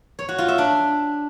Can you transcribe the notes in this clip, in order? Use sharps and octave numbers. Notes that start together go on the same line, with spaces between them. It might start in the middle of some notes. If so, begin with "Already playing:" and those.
C#5
F#4
F4
E5
D4